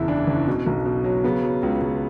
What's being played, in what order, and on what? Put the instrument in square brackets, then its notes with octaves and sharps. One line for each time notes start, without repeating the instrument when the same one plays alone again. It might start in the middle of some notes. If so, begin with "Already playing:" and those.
Already playing: [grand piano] F#1 E2 E4
E3 D4
F#1
B2
B1
B2
F#3
C#3 B3
F#3
C#2
C#2